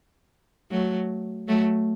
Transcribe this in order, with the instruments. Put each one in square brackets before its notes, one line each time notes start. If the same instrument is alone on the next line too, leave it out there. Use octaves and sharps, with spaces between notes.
[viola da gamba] F#3 A3
F#3 A3